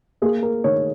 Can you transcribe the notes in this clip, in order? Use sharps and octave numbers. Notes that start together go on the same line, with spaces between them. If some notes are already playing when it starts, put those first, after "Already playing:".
A#3 G#4
A#4
D#3 C#5